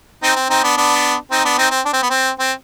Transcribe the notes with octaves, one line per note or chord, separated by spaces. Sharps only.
C4 D#4
C4
C4 D#4
B3 D4
B3 D4
C4 D#4
B3 D4
C4 D#4
C4
D4
C4
B3
C4
C4